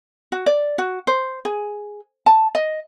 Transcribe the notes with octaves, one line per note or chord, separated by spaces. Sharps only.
F#4
D5
F#4
C5
G#4
A5
D#5